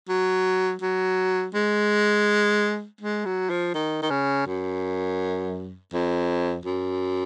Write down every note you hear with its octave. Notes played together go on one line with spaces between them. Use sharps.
F#3
F#3
G#3
G#3
F#3
F3
D#3
D#3
C#3
F#2
F2
F#2